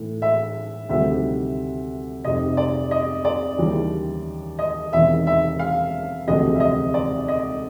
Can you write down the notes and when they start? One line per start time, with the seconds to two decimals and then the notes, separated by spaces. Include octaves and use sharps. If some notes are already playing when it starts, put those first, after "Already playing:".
Already playing: A2 E3
0.22 E5
0.89 D2 C3 D#3 G3 E5
2.25 F1 F2 C3 D#5
2.57 D5
2.91 D#5
3.25 D5
3.58 D#2 C#3 E3 G3
4.59 D#5
4.93 E1 E2 C3 D#3 E5
5.27 E5
5.59 F5
6.27 E1 D2 C3 F3 G#3 D#5
6.55 E5
6.60 D#5
6.94 D5
7.28 D#5